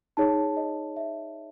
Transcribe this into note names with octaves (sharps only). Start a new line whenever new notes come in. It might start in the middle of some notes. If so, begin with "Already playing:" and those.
D#4 G#4 C#5 A5
D#5
E5